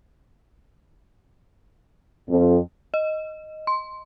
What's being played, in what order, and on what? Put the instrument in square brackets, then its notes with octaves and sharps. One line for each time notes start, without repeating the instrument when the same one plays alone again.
[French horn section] F2
[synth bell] D#5
C6